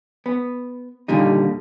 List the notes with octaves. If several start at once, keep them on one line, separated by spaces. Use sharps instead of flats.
B3
D#2 A#2 D3 G3 D#4